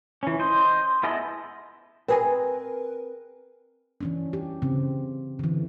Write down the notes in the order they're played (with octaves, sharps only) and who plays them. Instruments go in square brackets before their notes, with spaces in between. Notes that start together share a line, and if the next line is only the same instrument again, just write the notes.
[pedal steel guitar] E3 C#4
C5 D#5
B3 E4 G#4 A4 D#5
[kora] C4 G#4 D#5 [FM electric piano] A#4 B4
[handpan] E3 C#4 D4
G4
C#3 C4
D3 E3